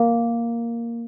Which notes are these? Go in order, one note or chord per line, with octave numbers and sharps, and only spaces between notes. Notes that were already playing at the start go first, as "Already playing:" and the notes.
Already playing: A#3